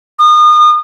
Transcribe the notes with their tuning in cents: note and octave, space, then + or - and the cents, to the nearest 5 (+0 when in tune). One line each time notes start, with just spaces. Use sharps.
D#6 -35